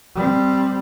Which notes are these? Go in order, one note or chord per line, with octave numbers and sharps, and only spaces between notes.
G3 C4